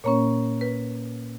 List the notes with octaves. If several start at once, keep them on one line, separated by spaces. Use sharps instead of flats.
A#2 A#3 C#4 C#5
B4